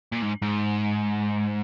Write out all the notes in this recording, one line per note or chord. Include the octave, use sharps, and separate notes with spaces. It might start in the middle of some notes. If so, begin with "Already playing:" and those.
A#2
G#2
G#2